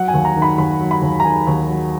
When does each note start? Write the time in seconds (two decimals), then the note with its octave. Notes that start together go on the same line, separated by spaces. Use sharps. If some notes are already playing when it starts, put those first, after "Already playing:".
Already playing: F#3 F#5
0.08 G#5
0.14 D#2
0.25 A#5
0.36 D#3
0.42 B5
0.58 D#2 B5
0.80 F#3
0.91 B5
1.02 D#2
1.20 A#5
1.25 D#3 G#5
1.47 D#2
1.69 F#3